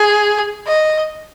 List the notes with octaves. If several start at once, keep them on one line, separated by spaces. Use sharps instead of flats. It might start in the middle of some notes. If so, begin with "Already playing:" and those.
Already playing: G#4
D#5